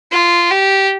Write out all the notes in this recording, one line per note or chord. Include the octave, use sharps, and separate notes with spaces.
F4
G4